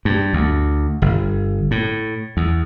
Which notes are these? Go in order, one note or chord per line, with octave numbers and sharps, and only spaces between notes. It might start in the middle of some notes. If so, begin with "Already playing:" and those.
G2
D2
G1
A2
E2